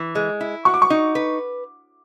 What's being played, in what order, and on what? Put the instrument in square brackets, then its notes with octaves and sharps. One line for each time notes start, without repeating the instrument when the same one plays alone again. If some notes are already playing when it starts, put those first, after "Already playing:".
Already playing: [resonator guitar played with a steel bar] E3
G#3
E4
[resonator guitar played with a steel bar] F#4 [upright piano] C#6
[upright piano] D6
C#6
[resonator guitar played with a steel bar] D#4
B4